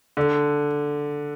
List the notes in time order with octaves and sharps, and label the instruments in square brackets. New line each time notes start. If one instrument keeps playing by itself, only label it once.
[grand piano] D3